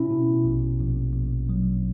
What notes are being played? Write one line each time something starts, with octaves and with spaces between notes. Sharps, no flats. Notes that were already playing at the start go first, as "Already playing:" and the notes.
Already playing: B2 C#4 E4
B2
A#1
A#1
A#1
F#3